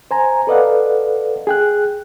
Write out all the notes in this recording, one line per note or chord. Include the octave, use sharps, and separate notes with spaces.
C5 G#5 A#5
A4 B4 D5 D#5 F5 F#5
G#4 G5 F#6